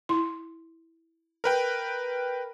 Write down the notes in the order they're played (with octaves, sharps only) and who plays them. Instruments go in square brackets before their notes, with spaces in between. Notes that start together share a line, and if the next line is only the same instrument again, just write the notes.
[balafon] E4 C6
[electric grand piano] A#4 B4 G5